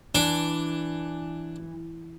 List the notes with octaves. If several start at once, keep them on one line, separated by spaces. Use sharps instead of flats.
E3 D4